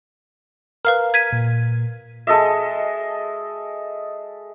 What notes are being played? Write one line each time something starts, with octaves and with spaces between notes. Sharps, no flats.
A#4 B4 F5 F6
G#6 B6 D#7
A#2
G#3 A4 D#5 E5